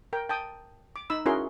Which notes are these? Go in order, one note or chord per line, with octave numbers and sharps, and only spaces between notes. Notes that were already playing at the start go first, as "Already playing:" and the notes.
A#4 G5
G5 A5 D#6
D6
D#4 B5 E6
C#4 E4 F#4 G#4 A#4 C6